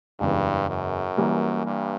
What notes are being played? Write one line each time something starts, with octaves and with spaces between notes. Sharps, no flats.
F#1 E2 G2 C#3 E3 G#3
F#2
E3 G3 A#3
G2